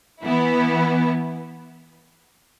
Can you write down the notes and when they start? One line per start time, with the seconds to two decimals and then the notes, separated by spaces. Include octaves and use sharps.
0.23 E3 B3 E4